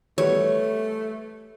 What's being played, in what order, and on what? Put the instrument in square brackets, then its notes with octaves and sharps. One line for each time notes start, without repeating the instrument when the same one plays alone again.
[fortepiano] E3 G3 B3 [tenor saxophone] A3 [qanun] C#5